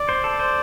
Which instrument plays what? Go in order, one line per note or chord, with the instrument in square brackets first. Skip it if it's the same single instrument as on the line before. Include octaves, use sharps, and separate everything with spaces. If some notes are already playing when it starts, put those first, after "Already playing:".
Already playing: [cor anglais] D5
[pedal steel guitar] C5
A4
C5